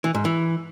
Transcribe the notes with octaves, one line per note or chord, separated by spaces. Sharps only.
E3
G#2
E3